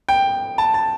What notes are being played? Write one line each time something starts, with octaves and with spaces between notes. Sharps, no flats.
G5
A5
A5